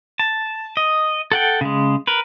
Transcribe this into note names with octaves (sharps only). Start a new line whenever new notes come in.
A5
D#5
A4 F#5 G5
C#3 G#3
A#4 B4